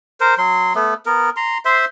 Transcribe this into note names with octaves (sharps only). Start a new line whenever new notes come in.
A#4 C5
F#3 C6
A3 B3
B3 A#4
A#5 C6
C5 E5 C6